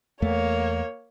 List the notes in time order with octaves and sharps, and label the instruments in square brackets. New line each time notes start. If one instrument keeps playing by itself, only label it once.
[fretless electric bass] E2 A3 [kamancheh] A#3 C#5